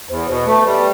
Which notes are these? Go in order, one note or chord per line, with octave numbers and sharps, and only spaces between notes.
E2 C5
B2 C5
A3 B4
G3